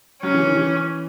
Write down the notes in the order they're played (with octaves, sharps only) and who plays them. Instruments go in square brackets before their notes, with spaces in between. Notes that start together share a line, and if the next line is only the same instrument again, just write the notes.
[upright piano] F#3 [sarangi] C#4
[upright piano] E3
D#3
E3